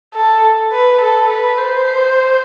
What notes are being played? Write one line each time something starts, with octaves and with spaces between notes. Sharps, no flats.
A4
B4
A4
B4
C5